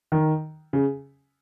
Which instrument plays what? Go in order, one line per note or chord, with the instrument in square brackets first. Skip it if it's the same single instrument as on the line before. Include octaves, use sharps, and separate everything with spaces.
[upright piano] D#3
C#3